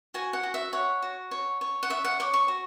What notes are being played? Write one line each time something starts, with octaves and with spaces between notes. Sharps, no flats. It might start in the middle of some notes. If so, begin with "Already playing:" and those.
F#4 G#5
F#5
F#4
E5
C#5 F#5
F#4
C#5
C#5
F#5
C#5 E5
F#5
C#5 D6
C#6
F#4